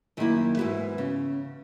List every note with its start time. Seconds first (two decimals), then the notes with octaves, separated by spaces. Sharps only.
0.17 F#2 D#3 A#3 E4
0.57 G#2 E3 B3 F#4 B4
0.98 C#3